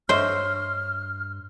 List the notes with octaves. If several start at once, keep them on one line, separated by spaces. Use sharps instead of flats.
G2 C5 C#5 D#5 E5 F6